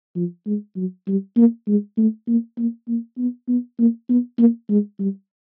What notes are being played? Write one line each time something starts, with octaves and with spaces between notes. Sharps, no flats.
F3
G#3
F#3
G3
A#3
G#3
A3
A#3
A#3
A#3
B3
B3
A#3
B3
A#3
G#3
G3